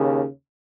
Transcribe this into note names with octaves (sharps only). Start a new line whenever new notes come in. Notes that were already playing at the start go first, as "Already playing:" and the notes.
Already playing: D#2 C#3